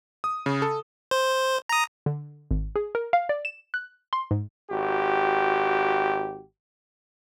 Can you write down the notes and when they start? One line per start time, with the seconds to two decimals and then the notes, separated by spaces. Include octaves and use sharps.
0.24 D#6
0.46 C#3
0.62 A4
1.11 C5
1.69 A#5 D#6
2.06 D3
2.51 G#1
2.76 G#4
2.95 A#4
3.13 F5
3.29 D5
3.45 E7
3.74 F#6
4.13 C6
4.31 G#2
4.70 G#1 F#4 G4